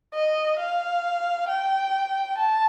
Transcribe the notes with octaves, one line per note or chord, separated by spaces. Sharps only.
D#5
F5
G5
A5